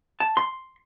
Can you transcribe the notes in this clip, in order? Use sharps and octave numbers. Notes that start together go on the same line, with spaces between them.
A5
C6